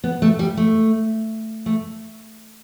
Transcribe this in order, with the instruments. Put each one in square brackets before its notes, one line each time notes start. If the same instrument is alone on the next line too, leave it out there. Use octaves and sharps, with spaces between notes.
[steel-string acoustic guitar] B3
A3
G3
A3
A3